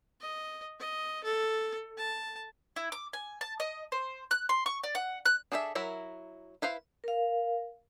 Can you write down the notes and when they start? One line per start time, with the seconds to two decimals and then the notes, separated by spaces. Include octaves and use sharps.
0.21 D#5
0.80 D#5
1.24 A4
1.97 A5
2.76 E4
2.92 D6
3.13 G#5
3.41 A5
3.60 D#5
3.92 C5
4.31 F#6
4.49 C6
4.66 C#6
4.84 D5
4.95 F#5
5.26 F#6
5.52 D4 G#4 A4 C5 E5
5.75 F#3 E4 A#4 E5
6.62 E4 B4 C5 F5
7.04 A#4 F5